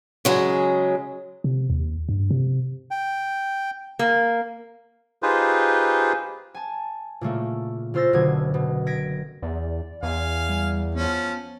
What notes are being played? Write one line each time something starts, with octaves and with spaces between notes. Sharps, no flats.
C#3 F#3 G#3
C3
D#2
G2
C3
G5
A#3
D#4 F4 G4 G#4 B4 C5
G#5 A5
A#2 C#3 A3 A#3
C#3 F4 C5 E6 A6 A#6
F#1 B2 D3 G#6
B2
G#6 A#6 B6 D7
E2 D5
E2 F5 G#5
G3
F3 B3 C#4